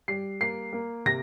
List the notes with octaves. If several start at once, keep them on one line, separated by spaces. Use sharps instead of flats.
G3 C7
A#3 C7
A#3
C3 A#6